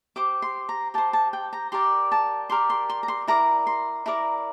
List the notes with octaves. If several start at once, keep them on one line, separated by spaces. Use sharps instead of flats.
G4 C5 D6
C6
A#5
G4 C5 A5
A5
G5
A#5
G4 A#4 D5 C6
A5
G4 A#4 D5 C6
C6
C6
A#5
C6
E4 A#4 D5 A#5
C6
E4 A#4 D5 A#5